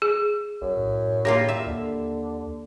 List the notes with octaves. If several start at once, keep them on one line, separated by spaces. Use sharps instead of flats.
G#4
B1 F#2
A2
G3 A#3 F4 C#5
E5
D#2 D3